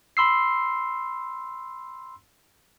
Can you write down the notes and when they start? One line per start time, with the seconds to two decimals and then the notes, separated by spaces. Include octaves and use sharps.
0.17 B5 C6 E6 C7